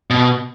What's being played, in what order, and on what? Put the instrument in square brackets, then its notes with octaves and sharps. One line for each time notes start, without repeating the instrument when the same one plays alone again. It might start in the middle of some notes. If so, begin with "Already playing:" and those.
[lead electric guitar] B2